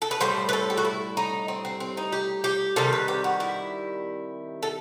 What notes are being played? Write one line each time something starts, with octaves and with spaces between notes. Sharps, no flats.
A4
B4
A2 G3 C5
B4
A4
G4
F#4
E4
D#4
C4
C4
C4
D#4
G4
G4
C3 D#3 G3 A4
B4
G4
F#4
E4
A4